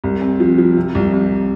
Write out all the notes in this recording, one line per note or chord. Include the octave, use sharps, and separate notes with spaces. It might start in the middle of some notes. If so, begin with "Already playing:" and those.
C2
C4
F3
F3
C3
C2
C2